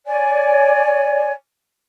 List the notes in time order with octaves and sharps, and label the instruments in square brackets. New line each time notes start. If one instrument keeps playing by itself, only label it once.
[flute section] C#5 D5 G#5